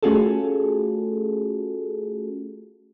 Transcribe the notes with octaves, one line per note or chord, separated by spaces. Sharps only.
A3 C#4 F4 F#4 G#4 A4